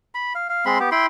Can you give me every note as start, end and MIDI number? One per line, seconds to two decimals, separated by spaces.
0.15 0.33 83
0.35 0.47 77
0.50 0.65 77
0.66 0.78 56
0.66 0.78 60
0.66 0.78 83
0.66 0.78 84
0.80 0.90 59
0.80 0.90 67
0.92 1.06 64
0.92 1.06 79
0.92 1.06 83
0.92 1.06 84